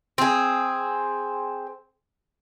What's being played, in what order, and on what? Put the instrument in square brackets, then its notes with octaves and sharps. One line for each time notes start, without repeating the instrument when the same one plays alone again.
[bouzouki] C4 G#4